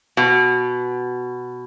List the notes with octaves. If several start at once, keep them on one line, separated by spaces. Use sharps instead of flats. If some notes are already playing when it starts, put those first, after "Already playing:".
B2